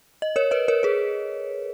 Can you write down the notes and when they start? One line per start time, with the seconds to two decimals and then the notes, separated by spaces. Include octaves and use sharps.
0.22 D#5
0.36 A#4 C#5
0.51 B4 D#5
0.68 A#4 C#5
0.83 G#4 B4